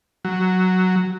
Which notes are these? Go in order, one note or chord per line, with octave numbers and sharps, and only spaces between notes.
F#3